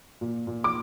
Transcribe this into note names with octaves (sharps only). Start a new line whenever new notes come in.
A#2
A#2
D6